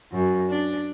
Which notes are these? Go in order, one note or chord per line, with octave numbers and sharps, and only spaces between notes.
F#2
D4